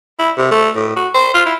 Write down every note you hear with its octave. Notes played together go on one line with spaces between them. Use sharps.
E4
C3
A3
A2
F#4
C5
F4
E4